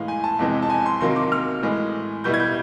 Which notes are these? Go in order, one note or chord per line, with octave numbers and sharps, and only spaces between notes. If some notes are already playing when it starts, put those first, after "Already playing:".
Already playing: A2 E3 G#3 F5
G#5
A5
F2 C3 E3 G#3
A5
G#5
C6
C3 D#3 F#3 A#3 C6
D6
F6
A2 E3 G#3
B2 G3 B3 E4 G6
G#6
G6